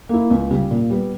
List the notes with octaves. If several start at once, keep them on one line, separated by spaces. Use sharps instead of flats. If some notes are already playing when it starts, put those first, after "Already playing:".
A#3 E4
C#2
C#3 G3
A#2
G3 B3